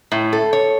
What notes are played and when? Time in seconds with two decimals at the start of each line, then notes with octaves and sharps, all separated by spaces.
0.12 A2
0.33 A4
0.53 C#5